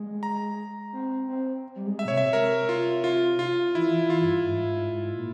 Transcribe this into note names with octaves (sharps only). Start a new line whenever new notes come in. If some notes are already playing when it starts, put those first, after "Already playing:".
Already playing: G#3
A#5
C4
C4
G3
G#3
E5
A#2
C3 C#5
E5
C3 A#4
F4
F4
F4
E3 E4
E3
F4
G2
G#2
G#2
G#2
A#2